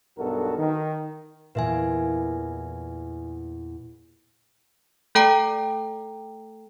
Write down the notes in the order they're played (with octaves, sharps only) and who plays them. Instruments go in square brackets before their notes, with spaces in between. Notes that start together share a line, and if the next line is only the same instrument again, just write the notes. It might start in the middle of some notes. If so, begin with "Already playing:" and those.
[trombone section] B1 G2 B3 F#4 A4 A#4
D#3
[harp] E2 A#2 [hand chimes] B4 E5 G#5
[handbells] A3 A4 G5 A#5 D7